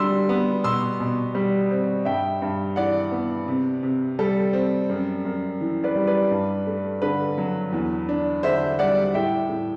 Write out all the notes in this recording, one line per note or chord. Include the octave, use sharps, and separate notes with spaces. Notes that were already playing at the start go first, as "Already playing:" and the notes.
Already playing: D3 G3 D4 C6 E6
B3
B2 C6 E6
B2
G3
C4
G2 E5 G5
G2
E3 D5 F#5
B3
C3
C3
G3 A4
C4
F#2
F#2
E3
B4 D5
G3
B4 D5
G2
A3
D3 B4
F#3
E2
D4
D3 C5 E5
G3 D5 F#5
A2 E5 G5
A2